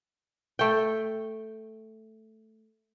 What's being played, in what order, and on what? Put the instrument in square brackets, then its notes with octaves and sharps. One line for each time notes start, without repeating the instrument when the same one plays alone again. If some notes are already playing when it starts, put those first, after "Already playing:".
[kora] A3 G5